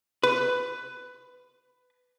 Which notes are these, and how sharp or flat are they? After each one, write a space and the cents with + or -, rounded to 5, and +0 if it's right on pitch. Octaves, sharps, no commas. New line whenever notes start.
B4 +15